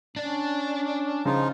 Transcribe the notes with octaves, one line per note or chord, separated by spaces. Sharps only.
C#4 D4 D5
C#3 F3 D#4 F4